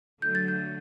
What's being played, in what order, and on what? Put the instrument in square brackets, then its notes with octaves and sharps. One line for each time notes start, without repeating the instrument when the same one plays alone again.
[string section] D3 F#3 A3 [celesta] G6
[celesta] A6
G6